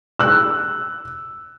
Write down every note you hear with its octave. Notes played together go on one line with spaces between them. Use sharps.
E6 F#6